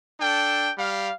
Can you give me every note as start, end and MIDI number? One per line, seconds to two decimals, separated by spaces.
0.20 0.69 62
0.20 0.69 69
0.20 0.69 79
0.78 1.11 55
0.78 1.11 77